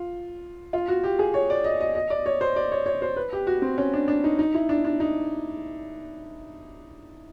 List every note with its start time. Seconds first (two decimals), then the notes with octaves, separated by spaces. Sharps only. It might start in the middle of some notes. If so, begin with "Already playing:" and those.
Already playing: F4
0.73 F4
0.88 F#4
1.04 G4
1.19 G#4
1.34 C#5
1.50 D5
1.64 D#5
1.81 D#5
1.95 D#5
2.10 D5
2.26 C#5
2.41 C5
2.56 D5
2.71 C#5
2.86 C#5
3.02 C5
3.16 B4
3.33 G4
3.47 F#4
3.62 C4
3.78 C#4
3.94 D4
4.08 D4
4.24 D#4
4.39 D#4
4.54 E4
4.69 D4
4.85 D4
5.00 D#4